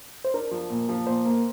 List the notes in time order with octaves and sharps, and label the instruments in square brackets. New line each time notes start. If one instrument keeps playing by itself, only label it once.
[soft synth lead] C5
[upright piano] D4 [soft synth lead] A#4
[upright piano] F3
A#2
F3
[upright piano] A#2 [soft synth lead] C5
[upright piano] A#3